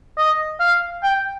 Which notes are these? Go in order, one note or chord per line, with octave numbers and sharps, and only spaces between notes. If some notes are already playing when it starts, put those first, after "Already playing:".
D#5
F5
G5